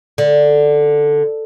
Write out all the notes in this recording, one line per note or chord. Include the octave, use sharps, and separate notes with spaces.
D3